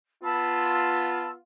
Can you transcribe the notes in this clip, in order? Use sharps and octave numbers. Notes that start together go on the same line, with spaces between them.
B3 F4 A5 B5 E6